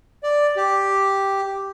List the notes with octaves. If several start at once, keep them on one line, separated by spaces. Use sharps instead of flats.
D5
G4